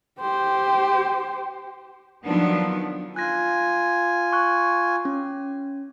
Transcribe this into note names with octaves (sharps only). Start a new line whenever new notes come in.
G4 C5
D#3 F3 F#3 B3 D4 D#4
F4 G#5 F#6 A#6
C#6 F#6
C#4